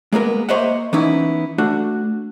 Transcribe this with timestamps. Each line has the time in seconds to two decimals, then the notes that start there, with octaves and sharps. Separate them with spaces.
0.12 G#3 A#3 B3 A#4
0.49 A#3 C5 C#5 D#5 E5 F#5
0.93 E3 B3 C#4 D#4 E4
1.58 A3 D4 F#4